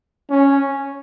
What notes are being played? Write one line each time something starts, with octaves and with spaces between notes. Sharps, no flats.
C#4